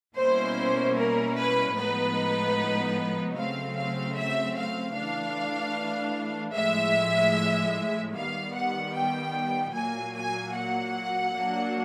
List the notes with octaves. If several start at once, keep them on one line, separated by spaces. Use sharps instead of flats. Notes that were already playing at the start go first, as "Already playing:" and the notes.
B2 G3 A#3 C#4 E4 C5
A#4
B4
A2 F3 G#3 B3 D#4 B4
C#3 F#3 A3 C4 F5
F5
E5
F5
E3 A3 D4 F5
A2 F3 G#3 E5
D#3 G3 B3 F5
F#5
G5
A#2 F#3 A#3 G#5
G#5
F#5
F#3 A#3 D4